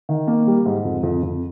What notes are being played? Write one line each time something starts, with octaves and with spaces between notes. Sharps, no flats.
D#3
A#3
G3
G#2
F2
F2
F2